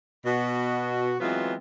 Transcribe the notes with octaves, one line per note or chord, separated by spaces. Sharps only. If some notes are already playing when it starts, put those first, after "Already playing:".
B2 F#4
E3 F#3 G#3 B3 C4 F4